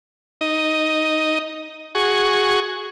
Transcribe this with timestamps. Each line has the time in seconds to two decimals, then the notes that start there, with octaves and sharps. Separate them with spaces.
0.41 D#4 D#5
1.95 F#4 G#4 C#6